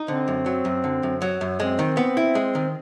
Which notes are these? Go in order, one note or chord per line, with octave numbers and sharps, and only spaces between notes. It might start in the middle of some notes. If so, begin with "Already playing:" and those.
Already playing: D#4
D3 C4
F#2
F#3
F#2
D3
F#2
F#3
F#2
G#3 C4
D#3
B3
E4
G#3
D#3